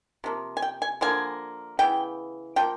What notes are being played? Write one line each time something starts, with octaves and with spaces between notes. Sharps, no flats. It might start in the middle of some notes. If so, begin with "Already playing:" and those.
C3 F3 A#3
G#5
G5
G#5
D3 F3 A#3 G#5
C#3 E3 B3 G5
F3 A#3 G5